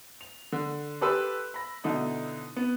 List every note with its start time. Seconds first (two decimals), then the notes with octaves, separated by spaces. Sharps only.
0.21 F7
0.52 D3
1.01 G4 A4 B4 C6 E6
1.54 B5 A#6
1.84 B2 D3 D#4 E4
2.56 B3